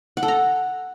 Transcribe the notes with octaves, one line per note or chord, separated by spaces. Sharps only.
F#5
A4
A#5